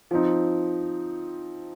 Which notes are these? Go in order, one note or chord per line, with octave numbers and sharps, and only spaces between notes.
F3 C4 D#4